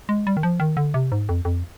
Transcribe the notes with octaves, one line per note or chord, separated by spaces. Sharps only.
G#3
G3
D#3
F3
D#3
D3
C3
G#2
F2
F2